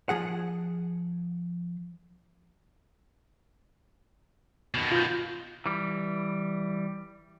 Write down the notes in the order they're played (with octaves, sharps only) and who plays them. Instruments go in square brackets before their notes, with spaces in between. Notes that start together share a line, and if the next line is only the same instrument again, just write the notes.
[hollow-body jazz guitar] F3 G#4 F#5
[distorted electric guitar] B2 D#3
[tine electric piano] F4 G6
[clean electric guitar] E3 G3